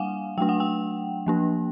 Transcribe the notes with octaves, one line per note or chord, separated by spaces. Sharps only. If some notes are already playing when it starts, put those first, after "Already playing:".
Already playing: G3 A#3 D4 F5 F#5 G#5
F#3 A3 D4 G5
F#5
G5
F3 A#3 D4